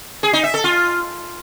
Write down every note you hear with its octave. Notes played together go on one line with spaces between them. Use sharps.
G#4
D#4
E5
A4
F4